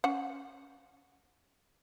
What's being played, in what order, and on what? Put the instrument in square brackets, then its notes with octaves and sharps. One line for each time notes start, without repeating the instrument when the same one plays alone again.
[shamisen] C#4 F#5